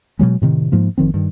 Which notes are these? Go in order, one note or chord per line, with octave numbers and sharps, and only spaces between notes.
B2 D3 F#3 G#3
A2 C3 D#3
G#2 F3 A#3
F#1 D#3 F3 C4
G2 D#3